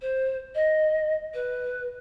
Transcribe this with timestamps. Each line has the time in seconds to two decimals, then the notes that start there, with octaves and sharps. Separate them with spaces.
0.01 C5
0.55 D#5
1.33 B4